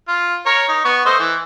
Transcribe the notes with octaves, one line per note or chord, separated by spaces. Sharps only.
F4
A#4 C#5
D#4
B3 C#6
A3 C5 D#5
E3